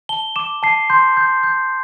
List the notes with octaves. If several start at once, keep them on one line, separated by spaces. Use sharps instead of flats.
A5 G7
D6 E7
A5 C7
C6 G6
G6
G6